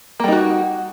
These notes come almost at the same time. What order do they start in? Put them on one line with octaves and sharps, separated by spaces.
A#3 G3 D#4 F#4